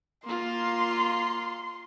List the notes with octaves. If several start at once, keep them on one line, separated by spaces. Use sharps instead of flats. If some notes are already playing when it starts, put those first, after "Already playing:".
A#3 F4 C6